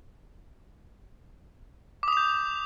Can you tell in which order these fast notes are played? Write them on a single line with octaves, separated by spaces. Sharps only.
D6 D#6 F7 G6